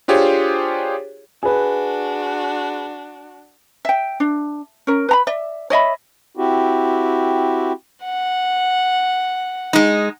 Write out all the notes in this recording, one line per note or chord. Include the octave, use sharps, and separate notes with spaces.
D4 F4 G4 G#4 C5 C#5
D4 F#4 G#4 B4
E5 G5
D4
C#4 A#4
B4 A#5 B5
D5 E5
C#5 D#5 E5 B5
C4 E4 F#4 G4
F#5
G#3 D#4